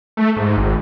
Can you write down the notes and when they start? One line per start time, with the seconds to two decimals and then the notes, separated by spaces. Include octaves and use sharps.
0.17 A3
0.37 G#2
0.57 G#1